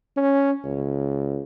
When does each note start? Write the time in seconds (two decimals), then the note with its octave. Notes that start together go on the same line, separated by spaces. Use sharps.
0.17 C#4
0.64 C#2